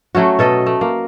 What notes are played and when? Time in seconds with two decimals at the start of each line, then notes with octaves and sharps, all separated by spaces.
0.15 F#3 A3 C#4 F#4
0.39 B2 A4 D#5
0.66 A3
0.81 A#3